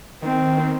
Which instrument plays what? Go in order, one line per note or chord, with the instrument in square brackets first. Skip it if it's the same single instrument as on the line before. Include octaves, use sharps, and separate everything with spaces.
[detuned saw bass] D#3 [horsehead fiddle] C4